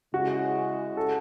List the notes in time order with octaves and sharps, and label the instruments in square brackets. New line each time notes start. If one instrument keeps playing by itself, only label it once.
[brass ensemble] C#3 G#3 C#4 E4 G#4 [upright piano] F#4
[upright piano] A4